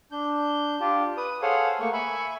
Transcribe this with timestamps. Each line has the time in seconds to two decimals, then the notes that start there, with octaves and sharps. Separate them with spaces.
0.12 D4 G6
0.80 D4 F4 G4
1.17 B4 D#6
1.42 G#4 A4 C5 C#5 F5 F#5
1.80 A3 A#3 C#6
1.93 E5 G#5 B5 C#6